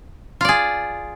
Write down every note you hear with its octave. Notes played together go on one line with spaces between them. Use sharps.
F4 G#4 D5